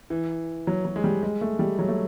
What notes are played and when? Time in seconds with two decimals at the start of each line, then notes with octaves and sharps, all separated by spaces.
0.10 E3
0.67 F#3
0.85 F#3
0.96 G#3
1.04 G3
1.23 G#3
1.41 A3
1.59 G3
1.79 F#3
1.88 A3